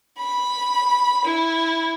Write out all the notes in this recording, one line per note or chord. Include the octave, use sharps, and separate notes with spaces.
B5
E4